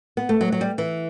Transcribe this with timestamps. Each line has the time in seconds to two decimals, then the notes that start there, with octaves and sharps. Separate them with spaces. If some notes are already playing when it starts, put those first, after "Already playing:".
0.17 B3
0.29 A3
0.41 F#3
0.52 F#3
0.61 G3
0.78 E3